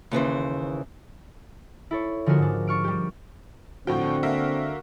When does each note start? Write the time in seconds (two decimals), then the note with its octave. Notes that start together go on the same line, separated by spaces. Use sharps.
0.11 D#2 C#3 E3 C5
1.91 E4 A4 C#5
2.26 D3 F3 G#3 F4 F#4 A#4
2.38 G#2 D4
2.67 D4 C#6 F6 D7
2.84 G3 G4
3.87 A2 D3 F3 C4 F#4 G5
4.23 A#3 A#4 E5